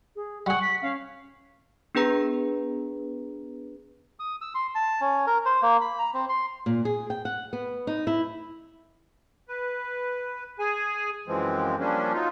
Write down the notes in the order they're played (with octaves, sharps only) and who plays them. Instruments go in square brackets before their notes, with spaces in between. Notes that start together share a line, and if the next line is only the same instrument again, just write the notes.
[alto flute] G#4
[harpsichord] G3 G#4 [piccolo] F#5 [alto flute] C#6
[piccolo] B6
[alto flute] C#4 [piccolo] F5
[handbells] B3 D4 G#4 B4 A#5
[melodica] D#6
E6
C6
A5
C#4
A#4
C5
A#3
B5
A#5
C4
C6
[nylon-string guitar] A#2
G#4
G5
F#5
B3
D#4
E4
[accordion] B4
G#4 G#5
F#2 E3 F3 G#3 C4
F3 G3 A#3 C#4 D4
F#3 D#4 F4